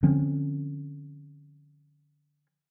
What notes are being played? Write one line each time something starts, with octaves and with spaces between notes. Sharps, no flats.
D3 F3 C4 C#4